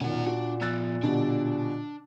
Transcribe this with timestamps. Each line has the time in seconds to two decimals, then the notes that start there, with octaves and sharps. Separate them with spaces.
0.01 E1 A#2 D#3 C#4 F#5
0.26 D4 F#4
0.61 F3 B3 E6 F#6 A6
1.03 B2 D3 G3 D4